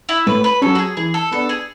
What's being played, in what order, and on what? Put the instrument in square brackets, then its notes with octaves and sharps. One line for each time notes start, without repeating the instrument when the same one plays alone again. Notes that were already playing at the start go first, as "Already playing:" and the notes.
[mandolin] E4
[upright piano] A2 [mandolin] B4
[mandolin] B4
[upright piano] F#3 C#4 [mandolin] A4
[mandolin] F#4
G#4
[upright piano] E3 [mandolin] G#4
[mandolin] A4
[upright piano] B3 D4 [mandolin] A4
[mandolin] G#4